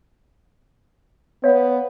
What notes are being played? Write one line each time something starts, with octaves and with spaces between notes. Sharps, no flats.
B3 C#5 F5